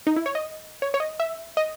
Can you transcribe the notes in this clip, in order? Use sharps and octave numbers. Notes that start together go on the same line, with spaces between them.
D#4
E4
C#5
D#5
C#5
C#5
D#5
E5
D#5